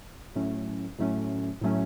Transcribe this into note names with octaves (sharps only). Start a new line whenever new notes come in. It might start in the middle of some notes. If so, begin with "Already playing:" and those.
A2 F#3 A3 C#4
A2 F#3 A3 C#4
A2 F#3 A3 C#4